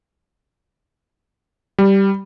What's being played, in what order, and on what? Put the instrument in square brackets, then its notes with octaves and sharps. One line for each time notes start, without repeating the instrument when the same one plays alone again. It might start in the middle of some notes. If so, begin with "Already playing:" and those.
[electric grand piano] G3